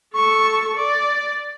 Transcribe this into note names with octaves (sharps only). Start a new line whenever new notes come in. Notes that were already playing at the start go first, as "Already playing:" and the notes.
A4 C#6
D5